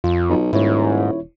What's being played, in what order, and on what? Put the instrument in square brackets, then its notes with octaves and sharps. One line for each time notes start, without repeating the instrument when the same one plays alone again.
[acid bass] F2 [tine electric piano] F4
[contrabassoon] B1
[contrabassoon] D#1 [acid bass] G#2 [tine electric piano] E4 C#5